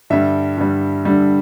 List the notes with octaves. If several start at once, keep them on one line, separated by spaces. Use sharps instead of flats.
G2 D3 G3 E5
G2 D3 G3
G2 D3 G3